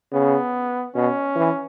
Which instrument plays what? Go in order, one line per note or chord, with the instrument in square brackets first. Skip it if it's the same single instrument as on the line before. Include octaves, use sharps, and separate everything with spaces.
[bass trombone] C#3 [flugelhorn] B3
[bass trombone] B2 [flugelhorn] C#4
[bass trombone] E3